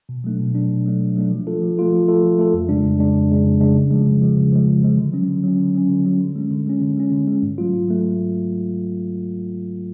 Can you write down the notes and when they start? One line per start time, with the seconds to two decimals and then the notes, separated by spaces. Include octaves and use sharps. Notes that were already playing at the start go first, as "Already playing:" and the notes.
0.09 B2
0.24 F#3 A3 D4
0.40 B2
0.55 F#3 A3 D4
0.70 B2
0.86 F#3 A3 D4
1.01 B2
1.16 F#3 A3 D4
1.31 F3
1.47 A3 F4 A4
1.62 F3
1.77 A3 F4 A4
1.92 F3
2.08 A3 F4 A4
2.23 F3
2.39 A3 F4 A4
2.54 F2
2.68 C#3 G#3 D4
2.85 F2
2.99 C#3 G#3 D4
3.15 F2
3.30 C#3 G#3 D4
3.45 F2
3.60 C#3 G#3 D4
3.76 C#3
3.91 F3 G#3
4.07 C#3
4.22 F3 G#3
4.37 C#3
4.52 F3 G#3
4.67 C#3
4.83 F3 G#3
4.98 D3
5.13 F#3 C#4
5.28 D3
5.44 F#3 C#4
5.59 D3
5.75 F#3 C#4
5.89 D3
6.05 F#3 C#4
6.20 D3
6.35 G#3 C#4
6.51 D3
6.66 G#3 C#4
6.81 D3
6.97 G#3 C#4
7.12 D3
7.27 G#3 C#4
7.43 G#2
7.58 F#3 A3 F4
7.73 G#2
7.88 F#3 A3